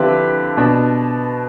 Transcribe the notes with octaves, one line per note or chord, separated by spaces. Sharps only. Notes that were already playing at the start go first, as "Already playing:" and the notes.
Already playing: D3 F3 C4 E4 G4 B4
B2 B3 D4